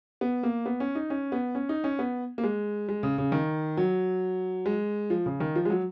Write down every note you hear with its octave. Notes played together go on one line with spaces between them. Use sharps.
B3
A#3
B3
C#4
D#4
C#4
B3
C#4
D#4
C#4
B3
A#3
G#3
G#3
C#3
C#3
D#3
F#3
G#3
F3
C#3
D#3
F3
G#3
F#3